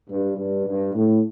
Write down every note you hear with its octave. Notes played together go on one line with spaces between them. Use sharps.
G2
G2
G2
A2